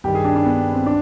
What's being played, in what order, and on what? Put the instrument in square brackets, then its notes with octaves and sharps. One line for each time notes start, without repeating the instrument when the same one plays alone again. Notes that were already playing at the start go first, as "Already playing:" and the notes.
[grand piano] G2 D#3 G3 G4
G#4
D4
D4
B3
C4
D4